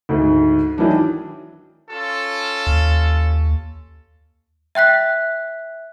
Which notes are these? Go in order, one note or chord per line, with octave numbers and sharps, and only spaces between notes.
D2 G#2
D#3 E3 F#3 D4
C#4 F4 A4
D#2
E5 G5 F#6 B6